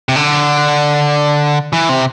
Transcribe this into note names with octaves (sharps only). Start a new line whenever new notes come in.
C3
D3
E3
C3